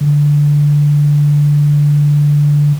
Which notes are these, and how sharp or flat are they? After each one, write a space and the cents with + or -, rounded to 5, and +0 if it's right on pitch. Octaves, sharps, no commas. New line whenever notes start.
D3 -5